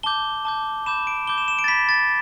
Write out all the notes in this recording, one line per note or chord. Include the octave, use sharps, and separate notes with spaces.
A5 D6 G6 G7
A5 D6 G6
B5 D6 G6 E7
D7
B5 D6 G6 G7
E7
E7
D7
A6
B5 G6 B6
A6